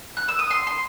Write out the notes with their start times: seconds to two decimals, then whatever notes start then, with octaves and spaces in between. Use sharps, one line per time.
0.17 F#6
0.28 E6
0.39 D#6
0.51 C6
0.67 C6